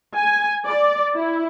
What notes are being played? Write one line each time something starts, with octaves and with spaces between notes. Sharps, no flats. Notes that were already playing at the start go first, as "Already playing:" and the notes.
G#5
D5
E4